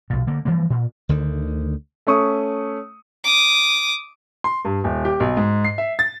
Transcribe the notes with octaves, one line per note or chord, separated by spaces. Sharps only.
B1 A#2
D3 A#3
E3 F3 G3 A#3
A#2
D2 D3 D#3
A3 C#4 C#6 D#6
D6 D#6
C6
G2
D#1
G4
B1
G#2
C7
E5
A6